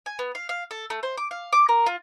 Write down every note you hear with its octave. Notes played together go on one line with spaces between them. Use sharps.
G#5
B3
F5
F5
A4
A3
C5
D6
F5
D6
A#4
F4